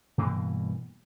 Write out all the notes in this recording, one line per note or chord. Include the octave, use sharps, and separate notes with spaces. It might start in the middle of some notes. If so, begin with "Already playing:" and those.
G2 B2 E3 A#3